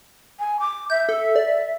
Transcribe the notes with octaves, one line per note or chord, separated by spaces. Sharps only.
G#5
D6
E5 G6
A4
D5